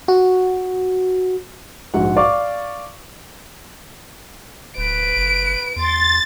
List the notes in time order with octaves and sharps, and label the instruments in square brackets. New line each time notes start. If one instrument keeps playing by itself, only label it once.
[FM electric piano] F#4
[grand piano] A#1 G#2 F#4 F#5
D5 F5 C#6 D6
[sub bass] D1 [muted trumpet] B4 [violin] D7
[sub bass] F#1
[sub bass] E2 [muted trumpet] C6 [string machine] A6